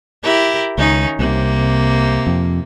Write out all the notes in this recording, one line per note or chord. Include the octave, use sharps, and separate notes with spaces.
E4 G4 A#4
C#2 D#3 C#4 D#4
C2 C3 A#3
F2